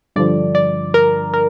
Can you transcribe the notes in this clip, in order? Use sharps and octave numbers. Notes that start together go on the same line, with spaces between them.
G2 D3 F3 D5
D5
A#4
A#4